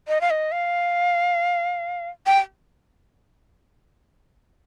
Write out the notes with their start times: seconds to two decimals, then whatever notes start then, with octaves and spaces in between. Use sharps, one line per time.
0.08 D#5
0.21 F5
0.30 D#5
0.52 F5
2.26 G5